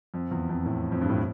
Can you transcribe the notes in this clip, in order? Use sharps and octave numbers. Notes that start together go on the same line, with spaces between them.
F2
E2
F2
A2
F2
G2
A2